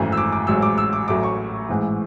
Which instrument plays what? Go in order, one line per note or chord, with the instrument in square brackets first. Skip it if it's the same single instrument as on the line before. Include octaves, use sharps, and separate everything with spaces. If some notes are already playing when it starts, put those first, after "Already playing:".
Already playing: [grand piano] G#1 F#2 E3 A3
E6
D6
D6
A1 G#2 F#3 E6
D6
E6
D6
A1 A2 F#3 A3 D6
C#6
A1 G#2 E3